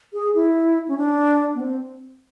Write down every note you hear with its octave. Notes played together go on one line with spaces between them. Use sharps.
G#4
E4
C#4
D4
B3
C4